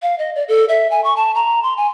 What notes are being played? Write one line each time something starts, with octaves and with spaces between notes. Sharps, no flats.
F5
D#5
D5
A4
E5
G#5
C#6
A5
A#5
C6
G#5